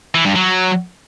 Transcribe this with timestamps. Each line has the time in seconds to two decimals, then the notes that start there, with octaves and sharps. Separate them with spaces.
0.14 E3
0.25 G2
0.35 F#3